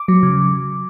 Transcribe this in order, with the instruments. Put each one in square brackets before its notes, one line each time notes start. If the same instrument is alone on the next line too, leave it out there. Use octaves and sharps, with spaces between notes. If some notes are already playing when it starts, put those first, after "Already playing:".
Already playing: [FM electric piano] D6
F#3
C#3